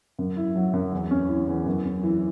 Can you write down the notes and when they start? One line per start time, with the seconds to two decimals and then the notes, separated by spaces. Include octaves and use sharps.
0.19 F#2
0.37 E4
0.56 F#3
0.73 F#2
0.92 E2
1.11 C#4
1.29 E3
1.48 E2
1.66 F#2
1.85 C#4
2.03 E3